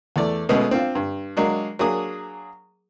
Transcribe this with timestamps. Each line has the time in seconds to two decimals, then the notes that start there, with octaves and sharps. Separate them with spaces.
0.16 E2 A3 D5
0.49 B2 G#3 A3 B3 C#4
0.71 C4 D4 F4
0.95 G2
1.37 F#3 G#3 A#3 D4
1.79 F#3 A#3 D4 G#4 D#6